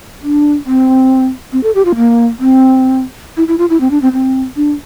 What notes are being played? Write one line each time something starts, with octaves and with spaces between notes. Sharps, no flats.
D4
C4
C4
A4
G4
F4
A#3
C4
E4
E4
F4
E4
C4
D4
C4
C4
D4